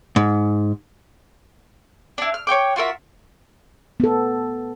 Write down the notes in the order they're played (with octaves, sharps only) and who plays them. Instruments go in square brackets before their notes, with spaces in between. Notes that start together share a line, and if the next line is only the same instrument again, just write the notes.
[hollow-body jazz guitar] G#2
[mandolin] D4 E4
F6
C#5 F5 G5 D6
F4 F#4 A#4 E5
[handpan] B3 A4